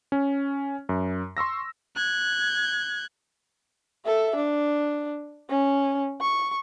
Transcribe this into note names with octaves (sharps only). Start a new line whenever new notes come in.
C#4
F#2
C6 C#6 E6 A#6
F#6 G#6
A4 E5
D4
C#4
C#6